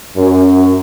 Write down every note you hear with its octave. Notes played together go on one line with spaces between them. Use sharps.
F#2